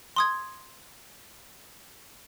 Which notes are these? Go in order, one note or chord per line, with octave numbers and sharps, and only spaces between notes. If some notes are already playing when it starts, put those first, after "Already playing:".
C6 D#6 G#6